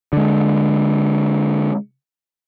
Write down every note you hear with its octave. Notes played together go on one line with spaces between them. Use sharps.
D3 G#3